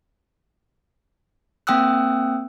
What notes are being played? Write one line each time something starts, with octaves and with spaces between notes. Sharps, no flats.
A#3 C4 G5 D#6 E6 F#6